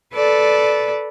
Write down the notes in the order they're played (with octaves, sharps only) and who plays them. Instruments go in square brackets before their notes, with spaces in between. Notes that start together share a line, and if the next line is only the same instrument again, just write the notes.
[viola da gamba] A4 B4 D5